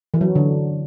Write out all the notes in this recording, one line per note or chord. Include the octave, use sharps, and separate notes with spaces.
E3
F#3
D3